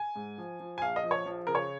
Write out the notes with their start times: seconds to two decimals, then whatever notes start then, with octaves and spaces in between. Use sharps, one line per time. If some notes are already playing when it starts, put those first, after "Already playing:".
Already playing: G#5
0.16 G#2
0.38 F3
0.60 F3
0.78 G#5
0.82 A#1 F5
0.96 D#5
1.04 F3
1.11 C#5
1.26 F3
1.47 C#3 A#4
1.55 C#5